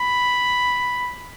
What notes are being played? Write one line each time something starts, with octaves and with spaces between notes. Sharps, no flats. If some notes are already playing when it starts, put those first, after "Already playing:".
Already playing: B5